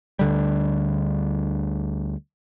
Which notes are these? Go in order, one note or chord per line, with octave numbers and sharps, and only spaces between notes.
D2 D3 G3